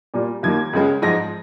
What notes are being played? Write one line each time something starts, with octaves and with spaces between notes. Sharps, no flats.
A#2 G3 A#3
D#2 D#3 A#3 G#6
C#2 C#3 G#3
G#2 F3 G#3 A#6